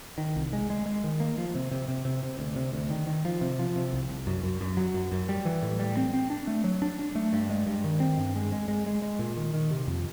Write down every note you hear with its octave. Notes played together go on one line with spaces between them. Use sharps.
D#3
C2
G#3
G#3
G#3
D#3
A#3
F3
C3
C3
C3
C3
C3
D2
C3
D2
D#3
D#3
F3
C3
F3
C3
C2
C2
F#2
F#2
F#2
F#3
F#2
F#2
G3
E3
A2
G3
C4
C4
D4
A3
F#3
D4
D4
A3
G2
G#3
G2
D#3
C4
G2
G#3
G#3
G#3
G#3
G#3
A#2
D#3
D#3
C3
F2